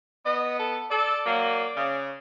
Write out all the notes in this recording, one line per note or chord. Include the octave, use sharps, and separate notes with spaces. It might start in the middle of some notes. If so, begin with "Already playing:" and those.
B3 D#5
A4
A4 D5
F#3 A#3
C#3